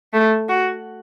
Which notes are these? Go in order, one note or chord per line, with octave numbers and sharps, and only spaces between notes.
A3
F#4